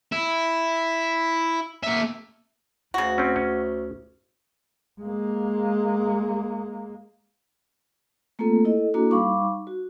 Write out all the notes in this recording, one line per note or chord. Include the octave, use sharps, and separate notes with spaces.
E4
A#3 E5
D2 C#3 F#4
C4 C#4
C#4
G#3 A#3
A3 A#3 C4 F4 A4
E4 A4 D#5
A#3 D4 E4 F#4 A4
G3 D#4 F5 B5 C#6 D6
F#4